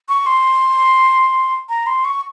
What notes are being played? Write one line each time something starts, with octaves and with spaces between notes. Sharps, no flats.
C#6
C6
A#5
C6
C#6